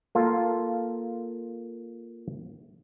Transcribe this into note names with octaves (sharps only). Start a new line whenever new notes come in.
A#3 F4 A4